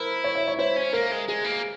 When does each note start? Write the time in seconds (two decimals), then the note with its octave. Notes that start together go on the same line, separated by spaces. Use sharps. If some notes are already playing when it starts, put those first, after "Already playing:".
Already playing: E4 A#4 C5
0.24 C#5
0.35 E5
0.48 C#5
0.59 E4 C5
0.76 C#4
0.93 A#3 A#4
1.11 G#3
1.28 G#3 G#4
1.44 A#3